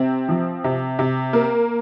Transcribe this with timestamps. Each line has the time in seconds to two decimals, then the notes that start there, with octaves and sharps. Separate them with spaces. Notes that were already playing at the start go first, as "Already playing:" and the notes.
Already playing: C3 C4
0.29 F3
0.64 C3
0.99 C3
1.33 A#3